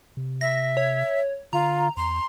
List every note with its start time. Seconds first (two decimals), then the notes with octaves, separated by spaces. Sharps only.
0.17 C3
0.41 E5 A#6
0.77 C#5
1.53 D3 F4 A#5
1.97 E2 C6